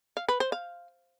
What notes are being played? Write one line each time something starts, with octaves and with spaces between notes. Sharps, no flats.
F5
B4
C5
F5